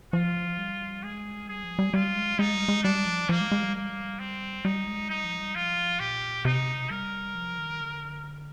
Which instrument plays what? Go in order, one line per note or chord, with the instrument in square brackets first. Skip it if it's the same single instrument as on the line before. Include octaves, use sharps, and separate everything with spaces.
[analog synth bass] F3 [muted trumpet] F4
[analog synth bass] G3
[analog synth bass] G#3 [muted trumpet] G#4
[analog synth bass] G3 [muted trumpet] G#4
[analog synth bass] F3
G3
[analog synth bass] G3 [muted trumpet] F4
[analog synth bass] G#3
[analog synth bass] G#3 [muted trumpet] D#4
[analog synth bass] G3
G#3
[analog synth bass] G3 [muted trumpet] D4
[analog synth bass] F3
[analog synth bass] F3 [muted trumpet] A#3
[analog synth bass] G#3
G#3
G3
[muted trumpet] A#3
C4
[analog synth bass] G3 [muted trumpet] D#4
[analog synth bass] G#3
[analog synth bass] G3 [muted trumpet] D#4
[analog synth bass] F3
G3
[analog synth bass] F3 [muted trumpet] F4
[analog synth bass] A#2 [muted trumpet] G4
[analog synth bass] C3 [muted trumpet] D#4
[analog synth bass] G3 [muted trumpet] A#4
[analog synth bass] F3
D#3
D3